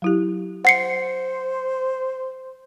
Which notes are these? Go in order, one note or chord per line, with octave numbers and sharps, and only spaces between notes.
F#3 E4 G4
C5 F#5 C7 C#7